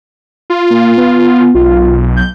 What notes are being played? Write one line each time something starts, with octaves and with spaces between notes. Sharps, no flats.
F4
A#3
B3
B1 F4
G6